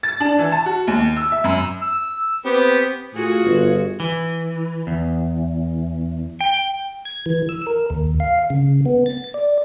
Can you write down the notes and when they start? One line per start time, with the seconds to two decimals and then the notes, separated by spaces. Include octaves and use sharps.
0.03 A6
0.20 D4
0.39 E3
0.52 A5
0.66 F#4
0.87 D#2
1.17 E6
1.32 E5
1.44 F#2
1.82 E6
2.45 B3 C4 G4
3.14 A2 F4 F#4 G#4
3.44 G1
4.00 E3
4.87 E2
6.41 G5
7.05 G#6
7.26 E3
7.49 E6
7.67 A#4
7.90 D#2
8.20 F5
8.50 C#3
8.86 B3
9.06 A6
9.34 D5